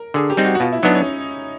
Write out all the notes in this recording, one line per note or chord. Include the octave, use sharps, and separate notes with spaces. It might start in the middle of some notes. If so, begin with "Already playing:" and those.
Already playing: A#4
D3 G#4
G4
G3 C4 D#4
F#4
F#4
B2 F4
E4
F#3 B3 D4 D#4
C#4